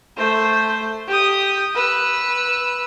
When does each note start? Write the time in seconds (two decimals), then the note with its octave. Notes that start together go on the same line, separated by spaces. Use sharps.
0.17 A3 C5
1.08 G4 D#6
1.75 B4 E6